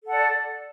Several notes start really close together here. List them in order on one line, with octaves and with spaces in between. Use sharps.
A4 F#5 D5